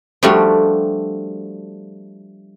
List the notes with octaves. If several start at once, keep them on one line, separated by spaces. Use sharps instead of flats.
F3 G3 A3 D4 F#4 G4